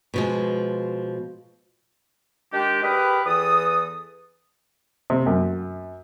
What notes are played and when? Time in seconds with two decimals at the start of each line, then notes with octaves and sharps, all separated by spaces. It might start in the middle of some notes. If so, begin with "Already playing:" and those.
0.14 B2 F3 G#3
2.52 D#3 G#3 D4 G4
2.82 G4 G#4 A#4 B4
3.25 E2 E3 A4 D#6
5.10 C3
5.26 F#2